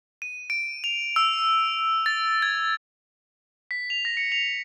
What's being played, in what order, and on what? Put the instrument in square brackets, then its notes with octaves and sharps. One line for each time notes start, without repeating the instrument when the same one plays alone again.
[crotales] D#7
D7
F7
E6
A6
G#6
B6
F7
A#6
C#7
F7